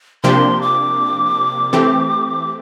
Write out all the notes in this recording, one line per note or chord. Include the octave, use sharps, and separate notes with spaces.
C3 F3 A#3 D4 G4 C6
D6
E3 A3 C4 G4